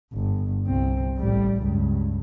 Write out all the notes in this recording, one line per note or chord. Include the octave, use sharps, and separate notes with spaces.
G1
C2 C4
A1 G3
C#2 G2